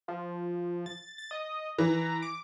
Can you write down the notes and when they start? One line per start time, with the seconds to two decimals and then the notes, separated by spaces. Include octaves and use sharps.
0.08 F3
0.86 A6
1.18 A6
1.31 D#5
1.78 E3 A#5
2.22 D6